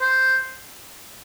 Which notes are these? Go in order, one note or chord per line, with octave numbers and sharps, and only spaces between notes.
C5